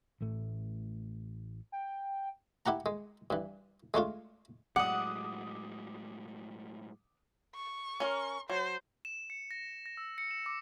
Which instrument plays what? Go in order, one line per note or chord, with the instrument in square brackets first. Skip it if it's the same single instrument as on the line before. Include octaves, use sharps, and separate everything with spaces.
[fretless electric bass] A1 A2 A3
[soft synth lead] G5
[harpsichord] E4 G4 F#5 A#5
G#3
G2 E3
G#3 A3 D4 F4
[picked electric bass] A2 F#3 G#3 [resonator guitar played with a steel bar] F#5 [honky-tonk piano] D6 D#6
[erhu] C#6
[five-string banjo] C#4 A#4
[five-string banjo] F#3 [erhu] C5
[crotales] E7
C#7
A#6
A#6
E6
C#7
E7
D6